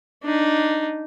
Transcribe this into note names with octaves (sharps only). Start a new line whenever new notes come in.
D4 D#4